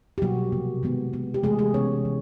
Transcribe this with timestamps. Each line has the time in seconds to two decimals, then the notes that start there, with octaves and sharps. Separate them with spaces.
0.18 G4
0.22 B2 F#3 G3 A#3 F#4
0.52 C3 F3 A#3
0.83 D#3 G#3 B3
1.13 D#3 G#3 B3
1.34 G4
1.43 C3 E3 G#3 A3 G#4
1.59 G#3 G#4
1.74 C3 E3 G#3 B3 C#4 C#5
2.05 E3